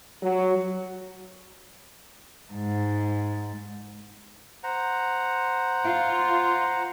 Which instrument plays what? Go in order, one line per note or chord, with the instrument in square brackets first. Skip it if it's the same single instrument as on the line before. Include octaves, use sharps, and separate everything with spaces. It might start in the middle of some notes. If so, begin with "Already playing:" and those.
[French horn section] F#3
[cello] G#2
[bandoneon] C5 F#5 A#5
[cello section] F4